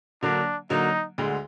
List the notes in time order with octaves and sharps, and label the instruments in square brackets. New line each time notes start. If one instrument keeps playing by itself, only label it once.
[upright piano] D3 F#3 A#3 [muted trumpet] D4
[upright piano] D3 F#3 A#3 [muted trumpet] D#4
[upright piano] D2 D3 G#3